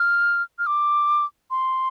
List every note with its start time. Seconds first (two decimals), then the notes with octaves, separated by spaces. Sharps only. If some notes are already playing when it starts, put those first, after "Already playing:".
Already playing: F6
0.59 F6
0.67 D6
1.51 C6